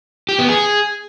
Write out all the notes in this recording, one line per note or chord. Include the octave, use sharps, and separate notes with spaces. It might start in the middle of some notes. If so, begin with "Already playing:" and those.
G4
B3
G#4